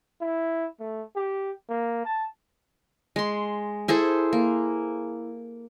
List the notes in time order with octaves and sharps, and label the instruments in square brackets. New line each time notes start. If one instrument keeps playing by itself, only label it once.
[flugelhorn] E4
A3
G4
A#3
A5
[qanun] G#3 C6
E4 G#4 A4 C5
A#3